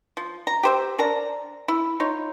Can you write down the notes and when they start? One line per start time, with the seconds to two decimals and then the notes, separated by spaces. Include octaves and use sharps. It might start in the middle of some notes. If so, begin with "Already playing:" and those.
0.17 F3
0.47 A#5
0.63 G4 C5 E5
0.98 D4 A#4 A5 A#5
1.68 E4
2.00 D#4 F4 C#5